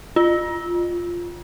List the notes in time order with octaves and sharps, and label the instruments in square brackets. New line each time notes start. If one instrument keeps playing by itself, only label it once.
[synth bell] F4